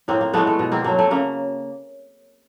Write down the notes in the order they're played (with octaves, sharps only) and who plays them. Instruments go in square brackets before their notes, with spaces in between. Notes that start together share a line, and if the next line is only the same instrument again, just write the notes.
[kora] A2 A#3 C4
A#3
E3 G#3 A3 B3
A3
B2
A#3 C4
F#3 A3 A#3
A3
C#3 A#3